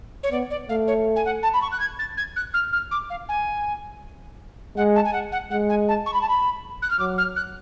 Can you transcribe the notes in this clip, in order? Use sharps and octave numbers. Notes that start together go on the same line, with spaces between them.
C#5
B3 D5
D5
A3 F5
C#5
G#5
F#5
A5
B5
C#6
F#6
G#6
A6
G#6
F#6
F6
F6
D6
F5
G#5
G#3 F#5
A5
G#5
F#5
F#5
G#3 F#5
G#5
A5
C#6
B5
A5
B5
F#6
F6
F#3 D6
F6
F#6